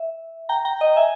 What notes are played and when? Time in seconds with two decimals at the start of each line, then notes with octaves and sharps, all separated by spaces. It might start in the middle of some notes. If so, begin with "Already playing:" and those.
Already playing: E5
0.49 G5 A#5
0.65 G5 A#5
0.80 D#5 G5
0.96 E5 G#5